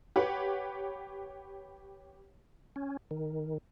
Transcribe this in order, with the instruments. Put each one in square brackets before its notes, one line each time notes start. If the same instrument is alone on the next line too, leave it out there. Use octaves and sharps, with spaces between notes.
[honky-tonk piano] G4 B4 C#5 F#5
[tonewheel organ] C#4
D#3